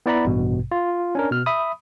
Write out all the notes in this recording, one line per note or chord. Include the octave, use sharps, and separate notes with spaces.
B3 E4 D5 F#5 A#5 B5
A1 G2 B2
F4
C#4 D4 A#4
B2 F6
E5 B5 D#6